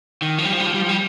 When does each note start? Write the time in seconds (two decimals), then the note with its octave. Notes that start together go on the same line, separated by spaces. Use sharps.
0.22 D#3
0.38 F3
0.45 G3
0.53 F3
0.60 G3
0.67 F3
0.74 G3
0.82 F3
0.89 G3